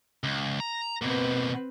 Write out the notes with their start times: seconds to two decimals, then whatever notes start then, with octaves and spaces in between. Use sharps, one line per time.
0.24 C#2
0.60 A#5
1.02 B2 A#3 C4 B4